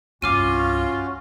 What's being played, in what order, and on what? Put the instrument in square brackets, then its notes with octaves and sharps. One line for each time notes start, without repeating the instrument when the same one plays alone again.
[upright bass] C2 G2 [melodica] C#4 F#4 [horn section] F4 [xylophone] D6 F6 D#7